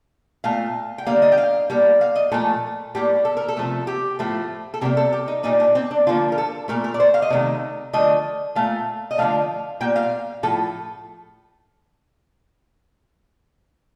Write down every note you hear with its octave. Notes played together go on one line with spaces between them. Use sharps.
A#2 A3 F5
G5
D3 G3 A#3 F5
D#5
G5
F5
A2 G3 A#3
F5
D#5
A#2 F3 A3 A4
A2 G3 A#3 G4
A4
A#4
A4
C3 F3 A3
G4
A2 F3 A3
A4
C3 G3 A#3 G4
A4
G4
D#4
A#2 G3 A#3 D#4
D4
C4
D4
D3 F3 A#3 F4
A#4
A4
A#2 A3 A#4
A#4
D5
C5
F5
D#5
C3 D#3 A3
D3 F3 A3 D#5
A#2 A3 F5
D#5
D3 F3 A3 F5
A#2 G3 A#3 G5
F5
A2 F3 A4